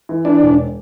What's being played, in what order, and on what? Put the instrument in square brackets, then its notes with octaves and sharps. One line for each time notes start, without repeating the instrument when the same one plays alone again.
[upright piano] E3
[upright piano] E3 [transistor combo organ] D4
[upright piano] E1